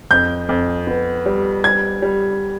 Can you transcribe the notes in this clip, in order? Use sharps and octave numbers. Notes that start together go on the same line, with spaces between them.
F2 G6
F2
B3
G3
G3 G#6
G3